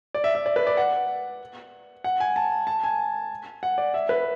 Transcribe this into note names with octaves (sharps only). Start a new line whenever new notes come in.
D5
E5
E5
D5
B4
D5
F#5
F#5
G#5
A5
A5
G#5
F#5
D5
E5
B4